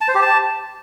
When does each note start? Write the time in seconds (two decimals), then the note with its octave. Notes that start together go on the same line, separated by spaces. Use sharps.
0.01 A5
0.08 C5
0.15 G4
0.22 A5